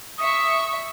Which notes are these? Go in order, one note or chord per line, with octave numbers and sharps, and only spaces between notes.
E5 C#6 D#6